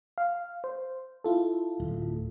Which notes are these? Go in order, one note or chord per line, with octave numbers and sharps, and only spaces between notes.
F5
C5
E4 F4 A4
D1